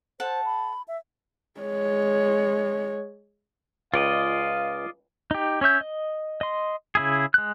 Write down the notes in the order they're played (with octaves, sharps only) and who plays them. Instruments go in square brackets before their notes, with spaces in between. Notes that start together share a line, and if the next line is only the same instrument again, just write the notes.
[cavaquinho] A4 F#5 A5 [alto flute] C5
[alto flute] B5
E5
[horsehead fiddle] G#3 C#5
[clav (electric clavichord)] C#2 [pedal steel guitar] F4 D5 D#5 [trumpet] F5
[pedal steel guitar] D#4 G4
C#4 C#5 E5 G6
D#5
D#5 C6
C#3 E4 G#4
G#3 F#6